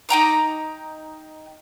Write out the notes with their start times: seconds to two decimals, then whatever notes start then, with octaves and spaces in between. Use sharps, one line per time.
0.09 D#4 G5 A#5 D6